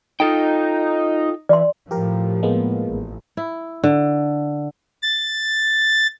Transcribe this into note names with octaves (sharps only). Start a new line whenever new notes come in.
D#4 F4 A4 G5
E3 D5 C6
A2 F3 G4 A#4
G#3 A#3 B3
A1
E4
D3
A6